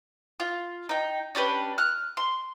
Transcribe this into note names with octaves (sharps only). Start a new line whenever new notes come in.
F4
D#4 G5
C#4 D4 G4 B4
F6 F#6
C6